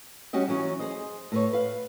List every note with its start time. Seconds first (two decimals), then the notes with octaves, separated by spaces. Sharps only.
0.33 G3 C#4 F#4 G4 D#5
0.48 E3 F#3 C#4 E4
0.80 G#4 C5 D#5
1.32 A2 B4 C#5
1.53 B4 F5